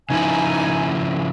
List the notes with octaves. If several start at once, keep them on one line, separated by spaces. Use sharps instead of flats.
C#3 F3 D#4 E4 G#5